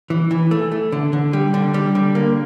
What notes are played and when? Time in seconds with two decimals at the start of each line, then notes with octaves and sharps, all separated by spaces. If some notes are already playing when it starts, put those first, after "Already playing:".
0.10 E3
0.31 E3
0.51 A3
0.72 A3
0.92 D3
1.13 D3
1.33 G3
1.54 D3
1.74 G3
1.95 D3
2.15 A#3